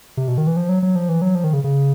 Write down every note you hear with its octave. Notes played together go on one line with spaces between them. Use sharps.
C3
B2
D#3
E3
F3
F#3
F#3
F3
E3
F#3
F3
D#3
C#3
C#3